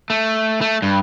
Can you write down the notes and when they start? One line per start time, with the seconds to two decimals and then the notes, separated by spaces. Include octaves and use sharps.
0.10 A3
0.61 A3
0.82 G2